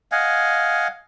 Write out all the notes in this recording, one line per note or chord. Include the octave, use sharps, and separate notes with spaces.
D#5 F5 F#5 G#5